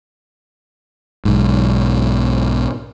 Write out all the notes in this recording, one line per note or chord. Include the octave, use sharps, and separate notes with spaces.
B1 G#2